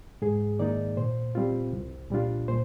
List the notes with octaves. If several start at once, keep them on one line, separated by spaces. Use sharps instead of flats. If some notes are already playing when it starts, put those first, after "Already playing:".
G#2 G#4
D#3 A#3 D#4 D5
A#2 C5
G3 C4 F4
C2
A#2 G3 D4 F4
A#2 C5